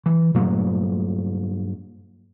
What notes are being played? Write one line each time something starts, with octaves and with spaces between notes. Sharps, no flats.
E3
G2 A#2 F#3 A3